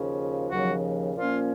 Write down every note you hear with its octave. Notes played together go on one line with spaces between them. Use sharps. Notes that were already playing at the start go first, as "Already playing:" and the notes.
Already playing: D#2 C#3 F3
D#2 C#3 F3 F#3 F#4
A#2 F3 A#3 C#4 F4